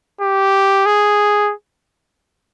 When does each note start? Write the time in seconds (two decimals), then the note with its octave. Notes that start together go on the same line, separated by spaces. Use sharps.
0.21 G4
0.86 G#4